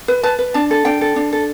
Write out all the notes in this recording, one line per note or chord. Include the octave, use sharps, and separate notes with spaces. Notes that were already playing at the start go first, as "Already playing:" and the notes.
B4
B4 A5
B4
D4 A5
A4
D4 G5
A4
D4
A4